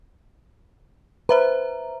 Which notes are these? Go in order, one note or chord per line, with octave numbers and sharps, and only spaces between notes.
B4 C5 E5 A#5